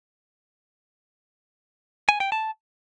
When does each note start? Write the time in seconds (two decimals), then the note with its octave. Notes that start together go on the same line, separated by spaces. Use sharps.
2.09 G#5
2.20 G5
2.32 A5